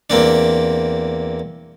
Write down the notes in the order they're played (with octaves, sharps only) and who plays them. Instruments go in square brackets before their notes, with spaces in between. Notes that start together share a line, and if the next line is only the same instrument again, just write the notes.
[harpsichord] E2 A#3 C4 D4